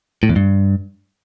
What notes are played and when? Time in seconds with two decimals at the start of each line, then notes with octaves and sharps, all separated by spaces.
0.23 A2
0.29 E2
0.36 G2